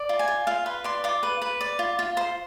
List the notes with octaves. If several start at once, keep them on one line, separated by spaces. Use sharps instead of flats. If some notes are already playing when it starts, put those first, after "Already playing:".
Already playing: D5
F4
G#5
F4
F4 F5
B4 C6
D5 C6
F4 D6
B4
B4
D5
F4
F4
C5 C6